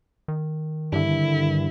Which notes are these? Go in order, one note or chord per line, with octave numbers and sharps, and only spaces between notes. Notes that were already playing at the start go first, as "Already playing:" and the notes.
D#3
G2 D3 E4